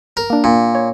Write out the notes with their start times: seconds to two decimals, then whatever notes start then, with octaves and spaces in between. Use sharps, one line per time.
0.17 A#4
0.30 A#3 D4
0.44 A#2
0.75 C#5